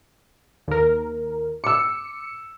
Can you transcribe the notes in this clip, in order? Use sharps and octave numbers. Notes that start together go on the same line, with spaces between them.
D#2 A#4
D6 E6 C#7